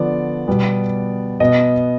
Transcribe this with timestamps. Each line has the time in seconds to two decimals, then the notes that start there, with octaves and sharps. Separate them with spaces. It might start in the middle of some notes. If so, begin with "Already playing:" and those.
Already playing: D3 F3 B3 D5
0.48 B2 G3 B3
1.40 B2 B3 D#5